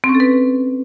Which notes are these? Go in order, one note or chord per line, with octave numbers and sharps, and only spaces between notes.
C4
C#4
A4
B4